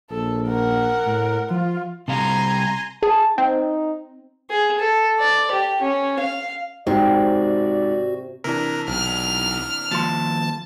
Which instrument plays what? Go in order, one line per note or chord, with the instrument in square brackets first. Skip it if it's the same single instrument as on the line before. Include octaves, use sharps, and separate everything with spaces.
[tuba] A#1 [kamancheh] A4
[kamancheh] A#4 F#5
[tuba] A2
[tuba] F3 [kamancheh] F4
[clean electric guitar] C3 G3 F5 [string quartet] G#5 A#5 C6
[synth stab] G#4 [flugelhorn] A5
[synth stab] C4 [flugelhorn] D#4
[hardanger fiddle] G#4
A4
D5
G4
C#4
F5
[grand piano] G#2 [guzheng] C3 [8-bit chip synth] F#4 [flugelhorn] D5
[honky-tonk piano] C3 E3 D4 [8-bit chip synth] A#4
[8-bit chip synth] B1 [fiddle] F6
[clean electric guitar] D#2 F3 C6 [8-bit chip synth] A5